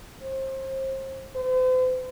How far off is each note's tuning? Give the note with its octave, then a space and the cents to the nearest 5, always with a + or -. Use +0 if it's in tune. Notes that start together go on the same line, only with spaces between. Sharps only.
C5 +30
C5 -40